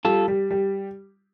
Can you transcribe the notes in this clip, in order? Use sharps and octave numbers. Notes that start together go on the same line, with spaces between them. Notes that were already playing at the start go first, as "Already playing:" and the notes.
G3 F4 A4
G3
G3